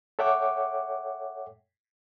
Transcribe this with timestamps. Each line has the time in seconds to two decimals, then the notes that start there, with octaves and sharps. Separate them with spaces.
0.19 A4 C#5 E5 F#5 G5 D6